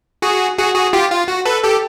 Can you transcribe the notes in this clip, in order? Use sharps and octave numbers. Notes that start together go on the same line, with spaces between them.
F#4 G#4
F#4 G#4
F#4 G#4
F4 G4
F4
F#4
A4 B4
G4 A4